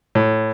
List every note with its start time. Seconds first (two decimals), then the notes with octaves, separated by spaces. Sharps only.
0.15 A2